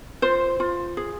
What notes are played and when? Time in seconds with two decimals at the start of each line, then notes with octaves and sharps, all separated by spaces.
0.22 F4 C5
0.60 F4
0.97 G#4